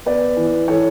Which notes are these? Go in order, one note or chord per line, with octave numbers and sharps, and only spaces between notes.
B3 B4 D5
E3
E3 A4 C#5